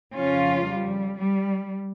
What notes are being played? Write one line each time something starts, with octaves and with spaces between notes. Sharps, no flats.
F2 C#3 F3 C#4 F4
G3
G3